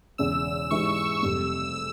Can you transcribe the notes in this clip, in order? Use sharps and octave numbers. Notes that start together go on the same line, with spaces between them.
E1 E2 C#3 E6
G#2 E3 G#3 E4 G4 C#6
C#6
F1 F2 C3 G3 E6
E6